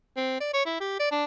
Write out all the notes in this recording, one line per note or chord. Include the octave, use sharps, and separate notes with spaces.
C4
D5
C#5
E4
G4
D5
D4